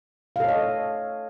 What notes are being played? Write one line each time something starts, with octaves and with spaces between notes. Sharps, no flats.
A4 C#5 D#5 F5